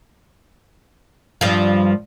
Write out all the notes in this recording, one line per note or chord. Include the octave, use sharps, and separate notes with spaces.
G2 F3